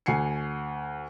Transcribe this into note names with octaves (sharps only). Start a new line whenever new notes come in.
D2 G#5 C7 C#7